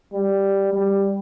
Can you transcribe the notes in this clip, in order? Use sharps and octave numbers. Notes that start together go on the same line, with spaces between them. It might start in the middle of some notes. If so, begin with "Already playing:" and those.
G3
G3